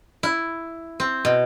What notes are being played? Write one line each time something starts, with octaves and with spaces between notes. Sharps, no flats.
E4
C4
B2